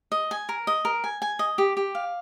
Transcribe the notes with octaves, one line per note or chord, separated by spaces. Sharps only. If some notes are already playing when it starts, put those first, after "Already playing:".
D#5
G#5
A#4
D#5
A#4
G#5
G#5
D#5
G4
G4
F5